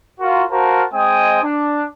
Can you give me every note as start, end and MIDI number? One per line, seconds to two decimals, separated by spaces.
0.20 0.43 65
0.20 0.43 66
0.20 0.43 70
0.50 0.83 66
0.50 0.83 70
0.50 0.83 72
0.50 0.83 77
0.50 0.83 81
0.93 1.41 56
0.93 1.41 60
0.93 1.41 75
0.93 1.41 79
0.93 1.41 80
0.93 1.41 87
1.43 1.85 62